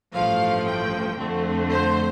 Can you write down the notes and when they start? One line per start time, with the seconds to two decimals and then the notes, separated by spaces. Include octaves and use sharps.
0.14 A1 G2 F3 A3 F5
0.67 G5
1.18 F2 D3 A3 C4
1.70 C5